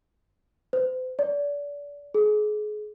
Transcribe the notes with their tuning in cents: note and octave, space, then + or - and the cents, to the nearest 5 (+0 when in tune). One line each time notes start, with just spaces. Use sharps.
C5 -40
D5 -30
G#4 +30